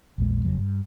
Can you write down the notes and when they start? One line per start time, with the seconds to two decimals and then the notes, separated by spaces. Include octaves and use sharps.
0.18 A#1 E2 A#2 G#3
0.45 F#1 F2 C#3 F#3
0.57 G2